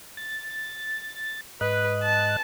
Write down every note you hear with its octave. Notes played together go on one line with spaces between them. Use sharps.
A6
G#2 B4 D#5 F#6
A5